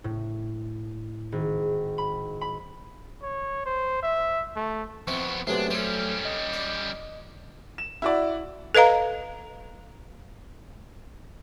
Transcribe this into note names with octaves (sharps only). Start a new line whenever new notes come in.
A2
G#1
B5
B5
C#5
C5
E5
A3
F2 B3 C4 E5 C#6
C3 F#3 G#3 A3 B3 D4
G3 C#4 A4 C5
D#5
D5
E7
E4 F#4 D5
A4 B4 D#5 F5 A#5